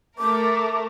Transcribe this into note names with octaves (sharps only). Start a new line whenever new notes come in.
A3 A#4 D6